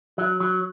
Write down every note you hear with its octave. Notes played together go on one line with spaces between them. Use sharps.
F#3
F#3